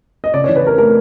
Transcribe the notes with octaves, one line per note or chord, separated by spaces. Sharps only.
D#5
C#3 D5
C#5
E3
B4
C4 A#4
A3 A#4